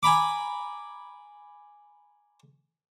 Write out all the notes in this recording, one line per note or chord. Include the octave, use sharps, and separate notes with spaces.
G#5 A#5 B5 D6